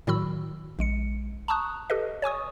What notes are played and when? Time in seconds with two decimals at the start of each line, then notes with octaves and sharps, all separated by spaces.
0.07 A2 D#3 F#3 F#4 B5 E6
0.79 A#1 G#3 C#7
1.48 A5 A#5 C#6 D#6 F#6
1.90 G4 A4 B4 D#5
2.22 C#5 G#5 C#6 D#6